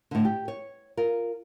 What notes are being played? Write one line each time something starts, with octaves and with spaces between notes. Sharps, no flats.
A2 D3
G4
C#5
F4 A#4